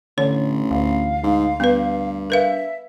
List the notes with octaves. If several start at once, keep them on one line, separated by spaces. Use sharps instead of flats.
A1 D3 C#5
D2 F5
G#2
G2 B3 B4
A#4 B4 E5 F5